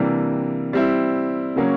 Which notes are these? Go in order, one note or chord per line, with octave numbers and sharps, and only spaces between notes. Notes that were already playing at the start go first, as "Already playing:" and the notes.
Already playing: C3 E3 G3 A#3 D4
G3 C4 E4
C#3 F#3 A#3 C#4